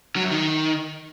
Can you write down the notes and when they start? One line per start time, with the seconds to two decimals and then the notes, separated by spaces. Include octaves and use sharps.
0.16 F#3
0.23 F#2
0.31 D#3